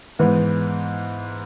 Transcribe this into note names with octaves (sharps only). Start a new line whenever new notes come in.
G#2 E3 B3